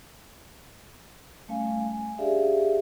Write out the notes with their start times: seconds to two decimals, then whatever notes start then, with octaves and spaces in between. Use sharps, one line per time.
1.48 G3 A3 C#4 F5 G#5
1.93 G#5
2.18 D4 G4 G#4 D5 E5 F5